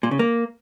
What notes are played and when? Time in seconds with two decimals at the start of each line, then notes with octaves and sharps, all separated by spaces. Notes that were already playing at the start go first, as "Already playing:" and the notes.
0.03 A#2
0.11 C#3
0.19 A#3